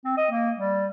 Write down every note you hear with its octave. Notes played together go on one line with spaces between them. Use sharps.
C4
D#5
A#3
G3